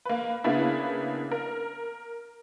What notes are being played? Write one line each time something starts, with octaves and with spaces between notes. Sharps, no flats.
A#3 B4
C#3 A#3 B3 D4 E4
A#4